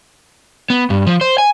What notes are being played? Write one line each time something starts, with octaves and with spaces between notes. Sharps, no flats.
B3
G2
F3
C5
G#5